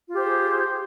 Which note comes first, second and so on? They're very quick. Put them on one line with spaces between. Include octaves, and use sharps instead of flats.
F4 G4 C5 G#4